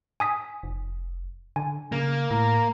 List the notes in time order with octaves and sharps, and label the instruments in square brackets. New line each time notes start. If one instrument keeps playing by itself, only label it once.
[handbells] G#5 D#6 B6
[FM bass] F1
[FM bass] D3 [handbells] G#5
[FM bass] C#3 [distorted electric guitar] A#3
[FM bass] A2 [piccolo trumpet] A#5